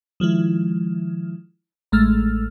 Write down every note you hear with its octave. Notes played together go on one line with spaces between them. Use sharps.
D#3 F3 G#3 E4
A1 G#3 A3 E6 F6 A6